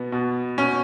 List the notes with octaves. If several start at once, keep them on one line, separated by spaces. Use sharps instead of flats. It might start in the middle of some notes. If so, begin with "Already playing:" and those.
Already playing: B2 B3
B2
B2 C#4